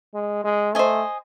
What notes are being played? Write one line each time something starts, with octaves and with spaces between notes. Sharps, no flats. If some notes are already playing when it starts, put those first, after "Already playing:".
G#3
G#3
A3 C5 D#5 G#5